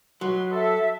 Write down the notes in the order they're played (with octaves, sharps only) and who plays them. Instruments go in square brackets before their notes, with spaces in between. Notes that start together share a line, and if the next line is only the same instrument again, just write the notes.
[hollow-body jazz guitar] F#3 [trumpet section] B4 D#5 C6
[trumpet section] A4 [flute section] E5